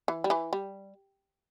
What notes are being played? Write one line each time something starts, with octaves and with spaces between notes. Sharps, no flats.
E3
G3
E3
G3